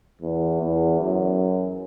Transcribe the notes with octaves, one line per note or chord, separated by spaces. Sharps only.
E2
E2
F#2